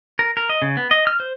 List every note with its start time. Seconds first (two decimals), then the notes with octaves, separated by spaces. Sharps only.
0.19 A#4
0.37 A#4
0.49 D#5
0.62 C#3
0.77 B3
0.91 D#5
1.07 F6
1.20 C5